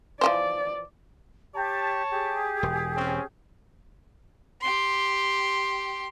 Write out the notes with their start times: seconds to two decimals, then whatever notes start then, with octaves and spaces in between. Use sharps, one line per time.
0.21 E3 F3 C5 D5
1.54 G4 C#5 A5
2.10 G4 G#4
2.63 E1
2.95 C4 C#4
4.61 G4 C6